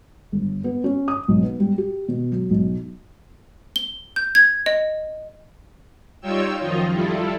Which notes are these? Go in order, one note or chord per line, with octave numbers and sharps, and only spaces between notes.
G1
B3
C#4
D#6
B1
B3
G3
G4
B2
F#3
B1
G7
G6
G#6
D#5
G3 D#4 F4 C#5 G5 E6
F#2 D#3 F3 D#4 F4 D#5
G3 E4 F4 A4